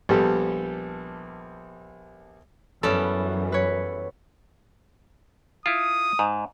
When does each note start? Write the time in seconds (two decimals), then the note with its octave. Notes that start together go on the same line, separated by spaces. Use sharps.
0.09 A#1 G3 B3 G4 A4
2.83 F#2 E3 G3 B3 C#4 A4
3.52 B4 C#5
5.66 E4 F4 D#6
6.19 G#2